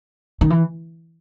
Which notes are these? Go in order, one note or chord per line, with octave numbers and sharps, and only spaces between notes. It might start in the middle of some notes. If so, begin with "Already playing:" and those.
D#3
E3